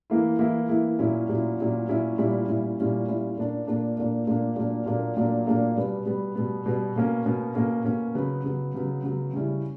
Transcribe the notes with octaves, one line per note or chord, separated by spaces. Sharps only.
E3 A#3 E4
E3 A#3 E4
E3 A#3 E4
A#2 F#3 C#4 E4
A#2 F#3 C#4 E4
A#2 F#3 C#4 E4
A#2 F#3 C#4 E4
A#2 G3 C#4 E4
A#2 G3 C#4 E4
A#2 G3 C#4 E4
A#2 G3 C#4 E4
A#2 A#3 D4
A#2 A#3 D4
A#2 A#3 D4
A#2 A#3 D4
A#2 F#3 A#3 D4
A#2 F#3 A#3 D4
A#2 F#3 A#3 D4
A#2 F#3 A#3 D4
B2 G3 B3
B2 G3 B3
B2 G3 B3
B2 G3 B3
B2 A#3 C#4
B2 A#3 C#4
B2 A#3 C#4
B2 A#3 C#4
C#3 F#3 B3
C#3 F#3 B3
C#3 F#3 B3
C#3 F#3 B3
C#3 G3 C#4 E4